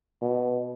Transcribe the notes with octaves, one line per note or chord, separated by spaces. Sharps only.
B2